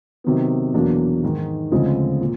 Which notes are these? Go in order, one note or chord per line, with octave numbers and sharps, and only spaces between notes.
C3 D#3 F#3 B3
E2 B2 F#3 A#3 D4
G#2 D#3 G#3
D2 C#3 F3 G#3 C4
A#2